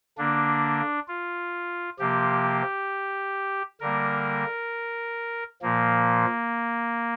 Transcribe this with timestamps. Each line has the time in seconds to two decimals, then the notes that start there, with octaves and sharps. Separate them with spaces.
0.18 D3 A#3 D4
1.08 F4
1.99 C3 F3 A#3 G4
3.80 D3 G3 A#3 A#4
5.62 A#2 F3 A#3